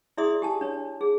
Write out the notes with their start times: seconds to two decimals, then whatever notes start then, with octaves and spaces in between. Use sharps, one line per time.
0.17 E4 G#4 D5 E5 C6 D#6
0.42 G4 G#5 A5
0.61 D4 C#5
1.01 G#4